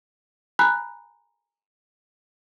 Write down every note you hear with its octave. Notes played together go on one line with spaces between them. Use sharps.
G#5 A#5 B5 F#6